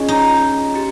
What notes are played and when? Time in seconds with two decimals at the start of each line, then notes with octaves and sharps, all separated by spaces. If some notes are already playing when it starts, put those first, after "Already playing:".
Already playing: C#4 F4 G#4 D#5
0.08 D#4
0.75 G4